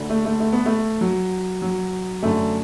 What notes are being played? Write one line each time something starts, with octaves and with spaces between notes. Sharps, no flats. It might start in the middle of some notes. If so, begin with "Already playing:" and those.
Already playing: D2 D3
A3
A3
A3
B3
A3
F#3
F#3
F#2 D3 A3